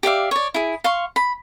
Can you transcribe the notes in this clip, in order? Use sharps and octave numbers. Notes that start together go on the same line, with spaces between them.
G4 D5 E5 F5
C#5 D5
E4 G#4
F5 C6 C#6
B5